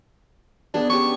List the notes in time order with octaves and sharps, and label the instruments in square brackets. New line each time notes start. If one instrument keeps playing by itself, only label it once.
[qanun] B3 G#4 B4 [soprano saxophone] D4
[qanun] C#4 D4 G4 [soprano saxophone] C#6